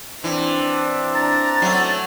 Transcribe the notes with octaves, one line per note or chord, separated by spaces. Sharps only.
E3 C4 D4
A#5 A6
F#3 A3 C#4